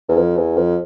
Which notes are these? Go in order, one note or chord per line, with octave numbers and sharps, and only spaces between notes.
E2
F2
E2
F2